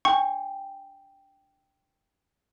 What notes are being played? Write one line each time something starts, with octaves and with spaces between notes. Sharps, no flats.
D4 G5 C#6